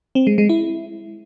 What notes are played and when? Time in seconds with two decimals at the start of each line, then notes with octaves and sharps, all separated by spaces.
0.15 C4
0.27 G#3
0.38 G#3
0.49 E4